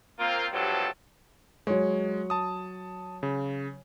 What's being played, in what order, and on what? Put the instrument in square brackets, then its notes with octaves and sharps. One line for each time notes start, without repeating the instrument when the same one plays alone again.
[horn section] A#3 C4 F4
G2 C3 F3 F#3 D4 A4
[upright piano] F#3 C#5 [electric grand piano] G#3
[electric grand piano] A5 D#6
C#3